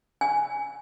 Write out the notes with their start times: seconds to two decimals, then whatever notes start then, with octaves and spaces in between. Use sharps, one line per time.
0.21 G#5